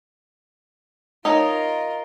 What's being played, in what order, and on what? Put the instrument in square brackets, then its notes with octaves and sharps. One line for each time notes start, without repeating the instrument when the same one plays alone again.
[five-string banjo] D#4 C#5 [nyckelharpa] F4 A#4